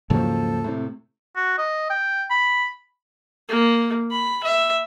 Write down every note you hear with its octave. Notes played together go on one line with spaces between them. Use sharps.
D#2 G#2 C#3 F3 F#3 A4
A2 C3
F#4
D#5
G5
B5
A#3
B5
E5